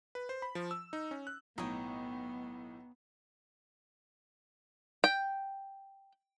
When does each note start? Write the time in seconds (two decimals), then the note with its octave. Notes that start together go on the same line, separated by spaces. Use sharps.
0.15 B4
0.29 C5
0.42 B5
0.55 F3
0.71 E6
0.93 D#4
1.11 C#4
1.27 F#6
1.58 B1 A2 B3 D#4 C#5 G5
5.04 G5